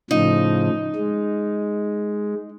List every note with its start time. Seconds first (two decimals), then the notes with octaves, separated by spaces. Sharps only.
0.11 A2 C#3 F3 D#4
0.95 G#3